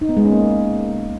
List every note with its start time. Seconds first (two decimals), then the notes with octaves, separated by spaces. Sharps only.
0.01 D#4
0.09 B3
0.17 G#3
0.24 C#4
0.32 A#3